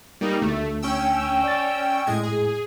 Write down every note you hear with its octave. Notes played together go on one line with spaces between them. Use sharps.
G3 A#3 D#4
D2 A3
C#4 G5 E6
D5 A6
F2 A2 G#3 D#5 G#6
G#4